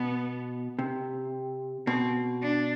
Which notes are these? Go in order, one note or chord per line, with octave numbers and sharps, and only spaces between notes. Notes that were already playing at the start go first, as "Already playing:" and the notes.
Already playing: B2 B3
C3
B2 C4
D4